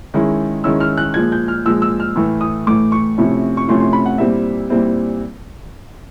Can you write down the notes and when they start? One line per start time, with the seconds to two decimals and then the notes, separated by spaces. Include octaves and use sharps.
0.14 D#3 G#3 C#4 E4
0.64 D#3 G#3 C#4 E4 E6
0.80 F6
0.98 F#6
1.14 A#2 F3 G#3 G#6
1.32 G6
1.48 F6
1.65 A#2 F3 G#3 E6
1.82 E6
2.00 F6
2.16 A2 E3 A3
2.41 D#6
2.67 A2 E3 A3 D6
2.92 C#6
3.18 C3 F3 A3 C#4 E4
3.57 C#6
3.68 C3 F3 A3 C#4 E4 C6
3.80 C6
3.93 B5
4.06 F#5
4.18 A#2 G3 C4 E4 E5
4.70 A#2 G3 C4 E4